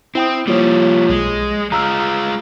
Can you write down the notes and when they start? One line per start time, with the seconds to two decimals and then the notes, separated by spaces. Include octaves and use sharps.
0.15 C4 E4 G5 D#6
0.47 F3 G3 A#3 F4 C#5
1.09 B1 G#3
1.72 G#3 F4 A#5 E6 F6